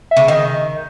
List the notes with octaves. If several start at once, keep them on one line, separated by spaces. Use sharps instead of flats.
E5
C#3
D#3 D#5